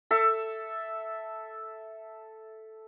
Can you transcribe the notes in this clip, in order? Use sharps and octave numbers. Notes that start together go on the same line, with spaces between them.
A4 E5